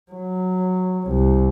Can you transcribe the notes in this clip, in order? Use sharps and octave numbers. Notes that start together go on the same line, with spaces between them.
F#3
C2